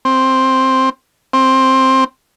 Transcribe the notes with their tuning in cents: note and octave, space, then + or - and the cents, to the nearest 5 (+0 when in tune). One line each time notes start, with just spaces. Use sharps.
C4 +5
C4 +10